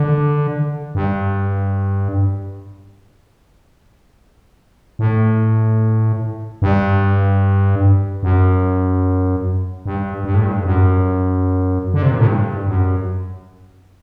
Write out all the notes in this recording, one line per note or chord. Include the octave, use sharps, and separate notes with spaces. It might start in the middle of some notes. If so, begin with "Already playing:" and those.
Already playing: D3
G2
A2
G2
F#2
G2
G2
A2
G2
F#2
D3
C3
A#2
A2
G2
F#2